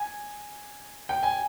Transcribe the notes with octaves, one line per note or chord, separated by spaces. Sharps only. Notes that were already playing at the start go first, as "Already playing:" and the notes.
Already playing: G#5
G5
G#5